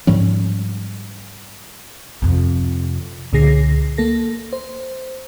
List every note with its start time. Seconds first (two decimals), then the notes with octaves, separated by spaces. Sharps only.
0.07 G#2 F3 G3 C#4
2.22 F2 C3
3.33 C#2 A#2 D3 G#4 A#6 C7
3.98 A#3 A4 A#6
4.53 C5